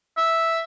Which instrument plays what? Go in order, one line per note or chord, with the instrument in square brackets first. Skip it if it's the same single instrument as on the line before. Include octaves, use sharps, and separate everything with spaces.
[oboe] E5